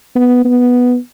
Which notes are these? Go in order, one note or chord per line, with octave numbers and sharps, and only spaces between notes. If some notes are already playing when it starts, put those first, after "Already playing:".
B3
B3